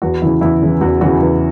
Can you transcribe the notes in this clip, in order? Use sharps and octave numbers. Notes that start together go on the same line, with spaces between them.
E2 F#4
C#3 E3 E4
E2 E4
C#3 E3
E2 F#4
C#3 E3 F#4
E2